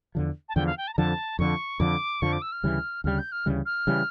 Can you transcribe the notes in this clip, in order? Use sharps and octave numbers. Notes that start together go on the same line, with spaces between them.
E2 D3 F3
A5
E2 D3 F3 G5
F5
G5
A5
A#5
F2 D3 F3 A5
F2 D3 F3 C#6
F2 D3 F3 D6
F2 D3 F3 C#6
D6
E6
F6
D2 C#3 E3 G3
D2 C#3 E3 G3 F6
G6
F6
D2 C#3 E3 G3
F6
C#3 E3 G3